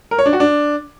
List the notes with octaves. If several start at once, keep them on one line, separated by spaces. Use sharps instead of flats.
A#4
C#5
D4
F#4
D4